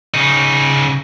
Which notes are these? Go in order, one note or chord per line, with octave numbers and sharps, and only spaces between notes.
C#3 D#4